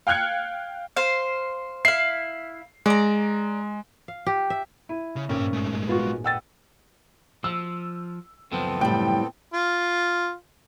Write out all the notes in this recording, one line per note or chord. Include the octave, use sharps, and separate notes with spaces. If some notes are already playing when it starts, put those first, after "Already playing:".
F5 G5 F6 F#6 G#6 C#7
C5 F5
E4 F5 C7
G#3 D5 A#5
F5
G4
E5
E4 D#7
C#3
G#1 G2 A#2 A#3 C#4 G5
G#3 A3
B3 F4 F#4 G#4
B4 D#5 F#5 G5 E6 A6
F3 E6
C#2 F#2 F3 B3 C4 A4
A2 G3 G5
F4